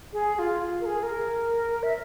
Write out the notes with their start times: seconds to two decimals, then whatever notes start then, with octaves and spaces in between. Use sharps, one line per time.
0.13 G#4
0.35 G#4
0.39 F4
0.81 A#4
0.86 G#4
1.03 A#4
1.83 E5